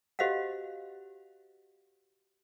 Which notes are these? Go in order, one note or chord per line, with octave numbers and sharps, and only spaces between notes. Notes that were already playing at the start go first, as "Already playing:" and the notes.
F#4 G4 C5 D#5 F5 F#5